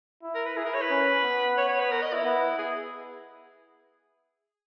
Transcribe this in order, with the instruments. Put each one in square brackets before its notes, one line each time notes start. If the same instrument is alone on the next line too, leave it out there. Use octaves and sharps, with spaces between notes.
[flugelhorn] E4
[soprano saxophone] A#4
B4
[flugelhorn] E4 [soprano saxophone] G#4
[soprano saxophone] A#4
C#5
B4
[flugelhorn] C#4
B3
[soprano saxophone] C#5
C#5
B4
A#4
D#5
E4
[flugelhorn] B3
[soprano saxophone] G#4